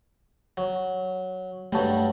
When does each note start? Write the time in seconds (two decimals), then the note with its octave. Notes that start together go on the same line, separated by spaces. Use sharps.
0.57 F#3
1.72 G2 F#3 G3 A3 A5